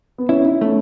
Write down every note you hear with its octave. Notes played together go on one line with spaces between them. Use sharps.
B3
C#4 E4
D#4
A3 C#4